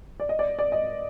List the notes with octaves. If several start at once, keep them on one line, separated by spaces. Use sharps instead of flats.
D5
D#5
D5
D5
D#5